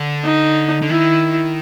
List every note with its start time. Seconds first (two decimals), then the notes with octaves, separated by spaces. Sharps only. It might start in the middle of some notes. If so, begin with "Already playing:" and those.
Already playing: D3
0.24 D#4
0.82 D3
0.89 D#3 E4